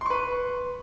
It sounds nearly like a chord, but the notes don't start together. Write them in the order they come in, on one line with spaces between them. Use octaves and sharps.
C6 C#6 B4